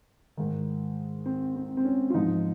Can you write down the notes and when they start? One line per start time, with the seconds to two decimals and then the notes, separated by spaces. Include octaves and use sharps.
0.37 G#2 D#3
1.26 C4
1.56 C4
1.77 C4
1.85 C#4
2.10 F4
2.14 G#2 F3 D#4